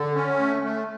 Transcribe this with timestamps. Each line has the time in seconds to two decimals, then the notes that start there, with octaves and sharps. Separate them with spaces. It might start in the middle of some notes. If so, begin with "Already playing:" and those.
Already playing: D3
0.15 C#4
0.39 A3
0.62 A3